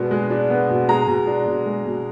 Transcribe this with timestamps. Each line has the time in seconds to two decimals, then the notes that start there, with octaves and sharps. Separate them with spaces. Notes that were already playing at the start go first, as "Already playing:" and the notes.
Already playing: B2 G#3 B3 D4
0.11 G#3
0.30 D4
0.50 B3
0.69 B2
0.89 G#3 A#5
1.07 B2
1.27 D4
1.47 B2
1.66 G#3
1.86 B2